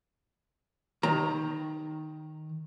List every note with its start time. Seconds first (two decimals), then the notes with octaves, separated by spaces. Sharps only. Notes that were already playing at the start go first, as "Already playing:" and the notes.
1.03 D#3 A#5